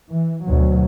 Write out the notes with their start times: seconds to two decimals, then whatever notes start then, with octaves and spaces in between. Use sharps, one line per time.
0.12 E3
0.47 D2 B2 F#3